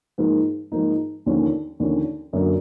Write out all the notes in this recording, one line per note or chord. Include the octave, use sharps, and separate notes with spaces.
G#2 F3 A#3 D#4
G#2 F3 A#3 D#4
D#2 D3 F3 A#3 C#4
D#2 D3 F3 A#3 C#4
F#2 D3 F#3 A#3 D4